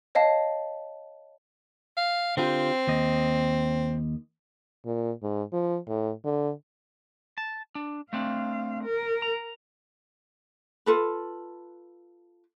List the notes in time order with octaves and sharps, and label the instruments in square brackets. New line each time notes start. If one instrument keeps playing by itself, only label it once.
[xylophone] C#5 D#5 F5 A5
[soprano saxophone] F5
[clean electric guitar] D3 F4 G4 [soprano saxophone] C4
[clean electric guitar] D#2 D#5
[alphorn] A#2
G#2
F3
A2
D3
[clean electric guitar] A5
D4
[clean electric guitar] A3 C4 D4 [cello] F5
[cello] A#4
[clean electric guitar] A#5
[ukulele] F4 A4 B4